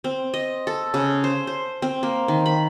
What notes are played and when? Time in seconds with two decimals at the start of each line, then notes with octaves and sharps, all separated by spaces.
0.04 C4
0.34 D#5
0.67 A4
0.94 C#3
1.24 C5
1.47 C5
1.82 C4
2.03 A#3
2.28 D#3
2.46 B5